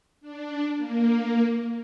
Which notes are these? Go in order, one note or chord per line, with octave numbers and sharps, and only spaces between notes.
D4
A#3